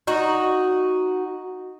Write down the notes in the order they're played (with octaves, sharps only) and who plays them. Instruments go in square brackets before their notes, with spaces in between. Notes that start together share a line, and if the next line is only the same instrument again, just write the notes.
[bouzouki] D#4 F#4